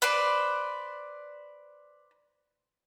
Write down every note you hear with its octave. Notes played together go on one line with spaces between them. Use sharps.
B4 C5 D5